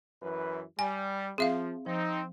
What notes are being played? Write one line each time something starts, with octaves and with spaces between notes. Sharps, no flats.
F#2 E3 B4
G3 G#5
F3 C4 G#4 E5 F5
F3 C4 D#4